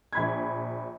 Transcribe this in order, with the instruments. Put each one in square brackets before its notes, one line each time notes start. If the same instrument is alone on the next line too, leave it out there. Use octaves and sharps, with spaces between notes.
[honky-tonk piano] A#1 B5 G#6